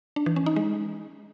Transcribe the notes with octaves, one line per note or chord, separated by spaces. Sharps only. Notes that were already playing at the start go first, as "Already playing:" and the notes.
D4
E3
C#4
D#4
G#3